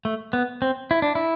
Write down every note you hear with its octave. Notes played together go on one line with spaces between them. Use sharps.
A3
B3
C4
E4
D4
E4